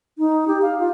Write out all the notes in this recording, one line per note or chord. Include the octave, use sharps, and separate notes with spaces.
D#4
G4
F5
F4